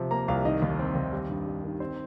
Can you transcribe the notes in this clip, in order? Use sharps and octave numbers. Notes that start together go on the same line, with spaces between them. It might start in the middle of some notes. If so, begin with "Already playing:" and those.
Already playing: C3 F3
A#3 A#5
C2 F5
D#3 D#5
D#2
C4
D#2
G3
G2
G3
D#3
C4 C5